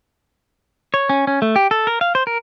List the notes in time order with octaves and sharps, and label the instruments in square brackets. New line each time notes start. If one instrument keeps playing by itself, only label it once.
[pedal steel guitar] C#5
C#4
C#4
A3
G4
A4
A#4
F5
C5
A#4